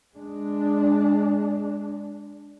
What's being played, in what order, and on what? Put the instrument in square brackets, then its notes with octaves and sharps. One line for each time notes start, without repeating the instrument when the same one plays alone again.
[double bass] G#3 D4